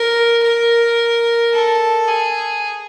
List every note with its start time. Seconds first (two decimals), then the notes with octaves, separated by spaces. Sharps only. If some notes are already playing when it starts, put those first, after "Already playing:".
Already playing: A#4
0.43 A#4
1.53 A4
2.08 G#4